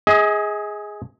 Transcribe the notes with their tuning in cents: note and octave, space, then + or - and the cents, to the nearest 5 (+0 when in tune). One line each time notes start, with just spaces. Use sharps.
G#4 +0 D#5 +35